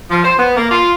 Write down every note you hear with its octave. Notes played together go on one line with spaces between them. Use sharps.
F3
C5
B3
A#3
F4